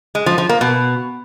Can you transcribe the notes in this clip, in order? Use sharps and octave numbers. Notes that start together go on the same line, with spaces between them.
G#3
F3
F3
A#3
B2